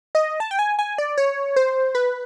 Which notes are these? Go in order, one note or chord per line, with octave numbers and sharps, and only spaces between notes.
D#5
A5
G5
G#5
G#5
D5
C#5
C5
B4